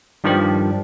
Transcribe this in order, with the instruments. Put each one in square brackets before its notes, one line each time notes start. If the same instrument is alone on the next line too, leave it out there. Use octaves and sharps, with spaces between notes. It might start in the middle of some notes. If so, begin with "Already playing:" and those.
[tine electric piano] G2 D#3 F3 D4 G4